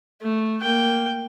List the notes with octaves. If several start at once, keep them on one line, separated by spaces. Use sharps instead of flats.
A3
A#3 G5